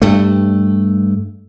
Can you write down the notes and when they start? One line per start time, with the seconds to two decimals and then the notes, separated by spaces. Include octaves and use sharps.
0.02 G2 A3